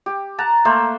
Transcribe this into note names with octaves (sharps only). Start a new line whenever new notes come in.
G4
F#5 A5 A#5
A3 A#3 C5 E5